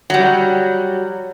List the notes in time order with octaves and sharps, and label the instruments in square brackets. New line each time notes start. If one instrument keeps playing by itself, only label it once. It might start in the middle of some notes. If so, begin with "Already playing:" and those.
[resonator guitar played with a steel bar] F#3 G3